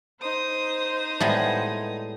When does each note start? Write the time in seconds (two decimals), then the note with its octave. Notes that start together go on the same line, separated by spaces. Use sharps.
0.22 D#4 C5 D#6
1.20 A2 G3 G#3 B3